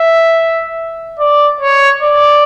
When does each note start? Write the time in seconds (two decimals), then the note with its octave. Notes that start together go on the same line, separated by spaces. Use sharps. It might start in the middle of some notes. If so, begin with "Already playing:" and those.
Already playing: E5
1.19 D5
1.60 C#5
2.02 D5